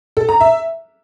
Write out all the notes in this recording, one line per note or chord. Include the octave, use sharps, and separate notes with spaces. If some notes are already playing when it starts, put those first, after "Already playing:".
A4
A#5
E5